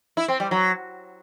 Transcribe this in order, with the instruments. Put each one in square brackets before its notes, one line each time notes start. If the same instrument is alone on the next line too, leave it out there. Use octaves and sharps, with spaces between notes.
[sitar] E4
C4
G3
F#3